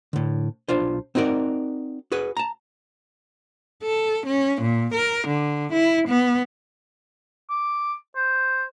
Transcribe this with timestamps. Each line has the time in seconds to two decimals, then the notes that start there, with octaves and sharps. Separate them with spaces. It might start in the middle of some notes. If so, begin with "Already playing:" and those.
0.13 A2 D3
0.68 B1 D4 F4 C5
1.15 C4 D#4 F#4 A#4 D5
2.12 F#4 G#4 B4
2.37 A5 A#5
3.83 A4
4.26 C#4
4.61 A#2
4.94 A#4
5.27 D3
5.72 E4
6.08 B3
7.50 D6
8.16 C5